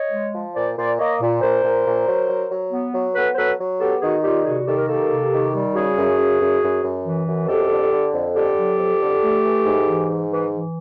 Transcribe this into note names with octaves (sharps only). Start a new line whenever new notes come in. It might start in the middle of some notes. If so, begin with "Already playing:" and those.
Already playing: C#5 D#5
G#3
F3
A#2 C5 D5
A#2 C5 D5
A#3 C#5 D#5
A#2
A#2 A#4 C5
A#2
A#2
F#3
F#3
F#3
B3
F#3
B3 A4 B4
C5
F#3 A4 B4
F#3
B3 G4 A4
D#3 F#4 G#4
G3 F4 G4
C3 F#4 G#4
D#3 G4 A4
A#4
A#3 G4 A4
C3
D#3
G3
C#3 F#4 G#4
F#2
C#3
F#2
F#2
F#2
E3
F#2
F2 G4 A4
D3
D3
F2
D3 G4 A4
F#3
F2
D3
A3
E3
G#2
E3
G#2
E3
E3